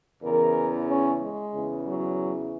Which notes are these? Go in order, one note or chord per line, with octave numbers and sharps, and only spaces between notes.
E2 C#3 E3 A#4
C#4
G#3
E2 C#3 E3
F#3